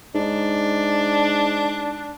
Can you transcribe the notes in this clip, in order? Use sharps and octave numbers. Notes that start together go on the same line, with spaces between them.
G#2 D4